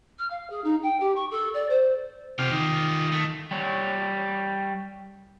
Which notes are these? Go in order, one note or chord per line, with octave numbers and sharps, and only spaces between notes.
F6
F5
G#4
D#4
G5
G4
C#6
A4
D5
C5
C3 F4 G4 F6
D#3
A3
G3 C#5